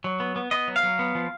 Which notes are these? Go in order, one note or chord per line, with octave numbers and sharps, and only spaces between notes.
F#3
B3
B3
B3 D#5
F#3
F5
F#3
B3
F3